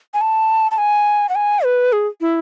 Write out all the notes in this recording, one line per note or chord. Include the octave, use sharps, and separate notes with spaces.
G#5
A5
A5
G#5
F#5
G#5
B4
G#4
E4